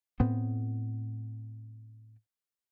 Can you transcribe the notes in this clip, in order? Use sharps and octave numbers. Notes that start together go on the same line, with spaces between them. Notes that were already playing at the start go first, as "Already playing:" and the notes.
A2 B3 C4